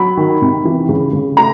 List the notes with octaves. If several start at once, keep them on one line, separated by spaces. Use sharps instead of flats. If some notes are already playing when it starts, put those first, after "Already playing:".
Already playing: F#3 B5
D#3
C3
E3
C#3
C#3
A3 A#5